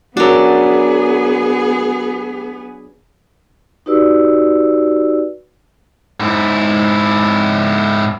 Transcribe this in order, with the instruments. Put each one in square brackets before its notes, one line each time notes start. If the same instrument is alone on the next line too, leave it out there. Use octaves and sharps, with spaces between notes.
[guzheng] F#3 D4 [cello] B3 G#4 [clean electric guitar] F#4 A#4
[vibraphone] D#4 F#4 G4 B4 D5 E6
[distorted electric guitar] G#2 E4